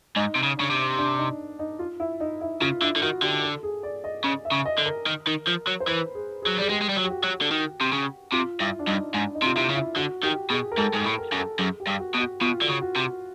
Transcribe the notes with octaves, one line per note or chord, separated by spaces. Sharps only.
G#2 D#4
C3
C#3
C#3 D4
C3
D4
D#4
D#4
F4
E4
D#4
E4
C#3 F4
D3 E4
D3
D#3 F#4
D3 G4
A4
G#4
D5
D#5
C#3 D#5
E5
C#3
D#5
D3
A#4
D#3
D#3
F3
F#3
C5
E3 B4
G#4
G#4
F#3
G3 G#4
G#3 G4
G#3
G3
F#3
G4
F#4
F#3
D3
D#3
C3
C#3
C3 F4
G2 E4
D4
G2 D#4
G#2 D4
D#4
C3
F4
C3 E4
C#3
E4
D3 F#4
D#3 G4
B2 G#4
A#4
G#2 A4
G#2 A4
A2
A#4
F#2
A4
F#2 G#4
G4
G2
F#4
B2
F#4
B2 F4
D3 F#4
C#3
F#4
C3